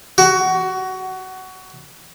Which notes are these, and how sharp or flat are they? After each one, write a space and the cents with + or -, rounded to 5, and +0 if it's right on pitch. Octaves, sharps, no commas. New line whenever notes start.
F#4 +20